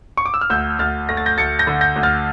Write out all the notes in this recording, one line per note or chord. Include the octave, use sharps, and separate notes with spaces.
C#6
D6
E6
F6
D2 E6 G6
D2 F6 A6
A3 A#6
A6
G6 A#6
D2 A6 C#7
G6 A#6
D3
G6 A#6
D2
F6 A6